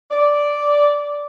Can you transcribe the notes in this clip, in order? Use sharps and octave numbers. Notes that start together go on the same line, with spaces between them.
D5